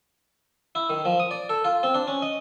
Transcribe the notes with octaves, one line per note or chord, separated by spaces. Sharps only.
E4
D#3
F3
D#6
D5
A4
F4
C4
D4
C#4
D#5